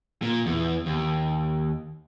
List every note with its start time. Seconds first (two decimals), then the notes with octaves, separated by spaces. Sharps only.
0.22 A#2
0.46 E2
0.86 D#2